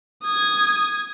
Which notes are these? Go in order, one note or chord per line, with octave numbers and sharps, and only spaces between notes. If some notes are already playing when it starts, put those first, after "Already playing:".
D#6 G#6